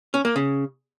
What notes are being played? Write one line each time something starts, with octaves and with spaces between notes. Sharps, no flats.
C#4
A#3
C#3